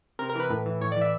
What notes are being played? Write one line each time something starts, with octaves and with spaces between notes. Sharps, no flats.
C3 A#4
A#4
E3 B4
A2
E3
A2 C#5
D5
E3
E5